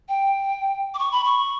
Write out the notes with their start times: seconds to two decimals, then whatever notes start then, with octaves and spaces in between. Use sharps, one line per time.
0.09 G5
0.94 D6
0.99 C#6
1.12 B5
1.25 C#6